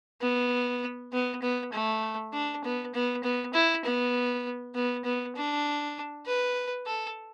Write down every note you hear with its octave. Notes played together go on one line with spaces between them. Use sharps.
B3
B3
B3
A3
D4
B3
B3
B3
E4
B3
B3
B3
D4
B4
A4